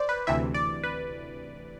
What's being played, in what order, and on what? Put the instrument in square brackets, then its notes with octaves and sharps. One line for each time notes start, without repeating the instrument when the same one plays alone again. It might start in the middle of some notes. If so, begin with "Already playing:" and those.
Already playing: [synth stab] C5 D5
B4
D2 C3 E3 E5
D5
B4